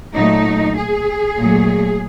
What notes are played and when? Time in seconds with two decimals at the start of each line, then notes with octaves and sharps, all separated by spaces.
0.15 A#2 F#3 A3 D#4
0.77 G#4
1.38 A#2 F#3 A3